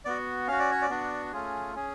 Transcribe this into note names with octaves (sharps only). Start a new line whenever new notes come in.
B3 F#4 D5
C#4 F#4 F5
D5
C#5
D5
B3 D4 F#4
A3 C#4 F4 G#4
C#4 G#4